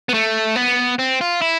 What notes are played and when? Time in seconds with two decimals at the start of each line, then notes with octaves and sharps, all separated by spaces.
0.09 B3
0.14 A3
0.56 B3
0.99 C4
1.21 F4
1.42 E4